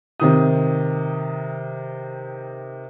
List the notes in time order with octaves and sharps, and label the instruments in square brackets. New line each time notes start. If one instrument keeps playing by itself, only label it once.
[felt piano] C3 D#3 D#6